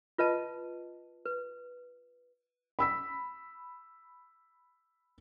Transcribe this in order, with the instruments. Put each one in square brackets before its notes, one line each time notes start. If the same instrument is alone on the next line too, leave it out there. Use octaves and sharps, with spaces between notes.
[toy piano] F4 B4 D#5 A5
B4
[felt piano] B5 E6 B6